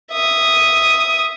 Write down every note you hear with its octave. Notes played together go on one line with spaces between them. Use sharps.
E5 D#6